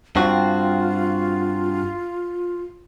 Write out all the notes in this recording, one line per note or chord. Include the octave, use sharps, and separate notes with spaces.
G2 C4 F4 F#4